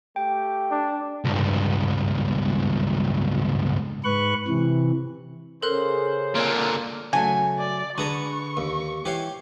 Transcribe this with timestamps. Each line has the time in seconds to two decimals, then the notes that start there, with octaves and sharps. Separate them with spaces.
0.16 A3 G4 G5
0.71 D4
1.25 C#2 G2
4.04 G#2 B4 C#6 F#6
4.48 C3 E3
5.62 C#3 A4 A#4 C5 F#6
6.35 A#2 D3 F4 A#4 C#5 D5
7.13 C#3 F#3 A3 G#5
7.59 D5
7.98 D3 D4 G#4 B4 A#5 C#6
8.57 D#2
9.05 E3 G4 C#5 F5